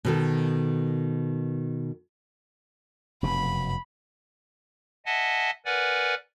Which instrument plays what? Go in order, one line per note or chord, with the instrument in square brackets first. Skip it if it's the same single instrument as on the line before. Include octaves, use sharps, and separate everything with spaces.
[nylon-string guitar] B2 D#3 A4
[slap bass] F1 F#2 B2 [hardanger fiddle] B5
[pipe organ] D#5 E5 F#5 G#5 A5
A#4 B4 D5 F#5 G#5